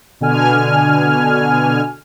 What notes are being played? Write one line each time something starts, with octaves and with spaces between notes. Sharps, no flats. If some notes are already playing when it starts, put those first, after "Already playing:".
B2 D3 G#5 F6